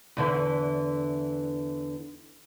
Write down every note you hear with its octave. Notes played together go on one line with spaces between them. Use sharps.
E2 D3 E3